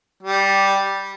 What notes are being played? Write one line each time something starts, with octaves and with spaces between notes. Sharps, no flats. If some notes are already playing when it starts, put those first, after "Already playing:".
G3